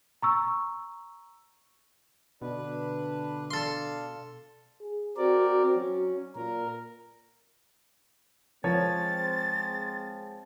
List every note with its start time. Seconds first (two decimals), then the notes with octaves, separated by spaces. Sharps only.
0.22 A#5 C#6 E6
2.42 B2 D3 D4 B4
3.51 D4 A4 F5 C6
4.80 G#4
5.17 C4 F#4 A#4 D5
5.47 F#4
5.76 F#3 C#4
6.35 A#2 A#4
8.64 F3 G#3 C4 A#4 C#5 A6